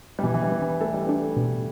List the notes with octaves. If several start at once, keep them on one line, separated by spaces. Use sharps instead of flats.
G3
B2 E3
E3
G3
B3
E3
A3 A4
G3
A3 D4
B2